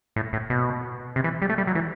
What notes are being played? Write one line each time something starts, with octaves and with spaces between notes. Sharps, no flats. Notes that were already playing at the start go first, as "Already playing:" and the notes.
A2
A2
B2
C3
E3
G3
A3
G3
F#3
E3